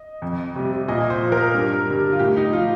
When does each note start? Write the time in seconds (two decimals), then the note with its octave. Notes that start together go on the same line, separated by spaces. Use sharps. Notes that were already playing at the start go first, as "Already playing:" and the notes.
Already playing: D#5
0.22 F2
0.55 C3 G3
0.88 A#2 D#5
1.10 C5
1.22 F3
1.32 A#4
1.55 G2
1.86 D3 G3
2.12 F4
2.19 A2 G4
2.37 D#4
2.53 F3 F4